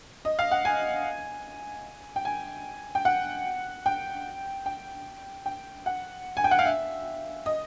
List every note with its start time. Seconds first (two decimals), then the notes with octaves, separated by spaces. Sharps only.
0.25 D#5
0.39 F5
0.51 F#5
0.65 G#5
2.16 G5
2.25 G#5
2.95 G5
3.05 F#5
3.86 G5
4.66 G5
5.46 G5
5.86 F#5
6.37 G#5
6.44 G5
6.51 F#5
6.59 F5
6.66 E5
7.46 D#5